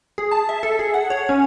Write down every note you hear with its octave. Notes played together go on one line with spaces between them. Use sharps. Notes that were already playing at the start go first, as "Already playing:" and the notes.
G#4
A5
E5
A4
G#4
F#5
C#5
C#4